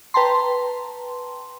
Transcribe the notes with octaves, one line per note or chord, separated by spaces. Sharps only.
B4 G5 A5 A#5 C6